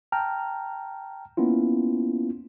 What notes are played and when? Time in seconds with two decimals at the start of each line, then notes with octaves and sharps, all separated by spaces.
0.12 G5 A5 A#5 F6
1.37 A#3 B3 C#4 E4 F4